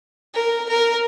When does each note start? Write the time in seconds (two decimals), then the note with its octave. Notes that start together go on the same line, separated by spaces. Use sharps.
0.35 A#4
0.69 A#4